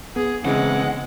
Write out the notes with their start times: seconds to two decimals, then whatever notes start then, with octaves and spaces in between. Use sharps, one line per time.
0.16 B3 G#4
0.45 C#3 E3 G#3 C4 F#5